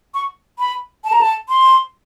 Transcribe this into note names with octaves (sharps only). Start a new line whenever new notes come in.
C#6
B5
A5
A#5
A5
C6